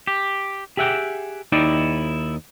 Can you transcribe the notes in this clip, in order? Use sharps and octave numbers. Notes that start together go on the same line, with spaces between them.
G4
G4 G#4 E5 F#5 G5
D#2 D#4 E4 D5 G5